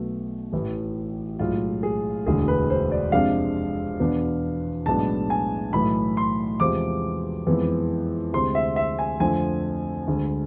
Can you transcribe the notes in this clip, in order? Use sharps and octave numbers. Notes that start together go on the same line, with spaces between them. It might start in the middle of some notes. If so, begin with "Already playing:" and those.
Already playing: B1 B2 A3
A1 A2 E3
B1 A2 G#3 F4
G#4
E1 D2 D3 G#4
B4
C5
D5
F2 C3 G#3 D4 F5
E2 B2 B3 D4
B1 A2 G#3 B3 D4 A5
G#5
B1 A2 E3 A3 B5
C6
E2 C3 F3 G#3 C4 D6
F2 E3 G#3 B3
D2 C3 G#3 C4 C6
E5
E5
G#5
F2 D3 F3 A3 C4 G#5
D2 D3 G#3